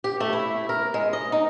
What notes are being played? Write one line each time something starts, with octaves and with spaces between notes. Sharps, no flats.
G4
A3
E4
A#4
G#3
D#5
D#4